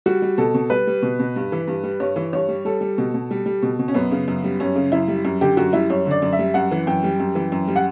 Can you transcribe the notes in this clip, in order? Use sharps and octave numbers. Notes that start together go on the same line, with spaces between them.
G3 F#4
G3
B2 A4
B2
G3 B4
G3
B2
B2
G2
E3
G2
G3
G2 C#5
E3
G2 C#5
G3
G3 A4
G3
B2
B2
G3
G3
B2
B2
C#4
F#2 B3
C#3
F#2
G3
F#2 C#4
C#3
F#2 E4
G3
F#2
D3 G4
F#2 F#4
G3 E4
F#2 C#5
D3
D5
F#2
E5
G3
F#2 F#5
E3
F#2 G5
G3
F#2
E3
F#2
G3
F#5